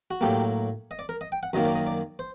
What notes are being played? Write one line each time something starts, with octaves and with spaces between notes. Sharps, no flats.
F#4
A2 F#3 A#3 G4
D#5
D5
A#4
D#5
G5
F#5
F#2 D#3 F#3 A#3 D#5
D5
D#5
D5
C5